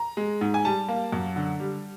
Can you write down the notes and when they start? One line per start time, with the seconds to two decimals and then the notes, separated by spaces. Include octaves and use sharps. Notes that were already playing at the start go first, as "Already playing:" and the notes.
Already playing: A#5
0.17 G#3
0.41 G#2
0.54 G#5
0.65 G3 A5
0.88 A#3
1.12 F#2
1.36 D3
1.60 G3